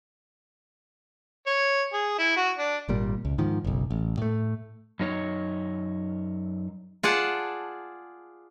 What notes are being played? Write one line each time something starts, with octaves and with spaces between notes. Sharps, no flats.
C#5
G#4
E4
F#4
D4
G#1 A#2 G3
C#2
G#2 D#3 F3
F#1 B1
A1
A2 A3
F#2 D#4 C#5
F4 G#4 D5 F#5 A5